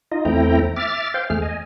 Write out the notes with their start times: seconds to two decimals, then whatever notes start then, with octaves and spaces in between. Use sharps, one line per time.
0.12 D#4 F4 D#5
0.25 E2 A3 C4 E4 G5 A#5
0.76 E5 D6 F6 A6
1.14 C5 F5 G5
1.30 E2 A3 G#4 F6
1.42 D#5 G#5